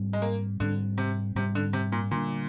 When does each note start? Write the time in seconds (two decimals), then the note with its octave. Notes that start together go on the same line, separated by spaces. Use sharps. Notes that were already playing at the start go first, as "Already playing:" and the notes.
Already playing: G#2 G3 C4
0.13 G#3
0.22 A#3
0.60 G#2 D3 G3 C4
0.98 C3
1.35 G#2 C3 G3 C4
1.55 D3
1.73 C3
1.92 A#2
2.11 A#2 D3 G3 D4